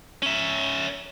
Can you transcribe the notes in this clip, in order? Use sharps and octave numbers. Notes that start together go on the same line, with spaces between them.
C#4 E5